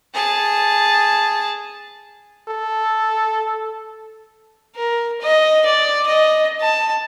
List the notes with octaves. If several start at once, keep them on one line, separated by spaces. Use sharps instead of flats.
G#4 A5
A4
A#4
D#5
D5
D#5
A5